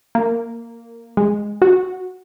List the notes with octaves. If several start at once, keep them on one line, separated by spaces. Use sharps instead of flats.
A#3
G#3
F#4